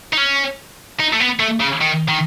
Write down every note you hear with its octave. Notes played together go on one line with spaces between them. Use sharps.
D#4
C#4
D#4
A3
B3
A3
C#3
D#3
D#3